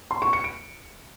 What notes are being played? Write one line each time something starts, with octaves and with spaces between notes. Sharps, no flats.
C6
C#6
C#7
D7